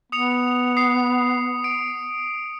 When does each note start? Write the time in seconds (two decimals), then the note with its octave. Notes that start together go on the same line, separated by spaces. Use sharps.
0.12 B3 D#6 C#7 F7
0.77 D#6 C7
1.64 D7